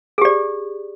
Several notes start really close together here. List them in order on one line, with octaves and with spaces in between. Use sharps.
G#4 G4 D5